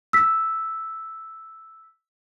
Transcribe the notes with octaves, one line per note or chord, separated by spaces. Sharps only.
E6 B6